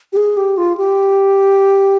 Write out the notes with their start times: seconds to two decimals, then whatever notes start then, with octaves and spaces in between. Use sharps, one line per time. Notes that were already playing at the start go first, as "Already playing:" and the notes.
0.13 G4
0.17 G#4
0.37 G4
0.57 F4
0.77 G4